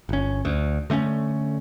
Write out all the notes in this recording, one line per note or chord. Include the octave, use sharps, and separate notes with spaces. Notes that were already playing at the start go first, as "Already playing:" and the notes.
G1 C#4
D2
D3 A3 C4 C#4